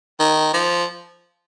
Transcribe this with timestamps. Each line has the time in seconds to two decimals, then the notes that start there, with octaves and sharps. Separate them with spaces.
0.20 D#3
0.54 F3